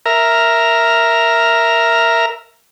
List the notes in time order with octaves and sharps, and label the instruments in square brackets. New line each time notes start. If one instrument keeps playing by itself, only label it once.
[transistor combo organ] A#4 E5 A#5 F6